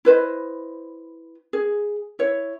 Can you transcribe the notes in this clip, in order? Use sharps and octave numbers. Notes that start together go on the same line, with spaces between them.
E4 B4 C5 D#5
G#4
E4 C#5